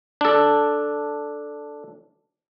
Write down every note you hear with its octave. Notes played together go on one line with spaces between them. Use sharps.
D4 A4